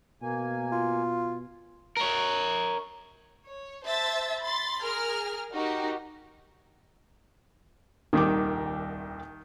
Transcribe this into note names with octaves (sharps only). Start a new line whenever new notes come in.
B2 A#3 G#5
F4
A#4 C#5
C#5
C5 E5 A5 E6 A6
B5 C6 A6
G#4 A#4 F6
D#4 F#4 G4 A#4
D#1 C2 D#3 D6